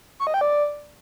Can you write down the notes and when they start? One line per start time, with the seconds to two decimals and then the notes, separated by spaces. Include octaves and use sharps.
0.20 C#6
0.27 D#5
0.34 G5
0.41 D5